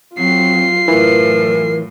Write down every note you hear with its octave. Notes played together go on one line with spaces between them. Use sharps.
F#3 C4 F4 C7
F#2 A2 E3 A#4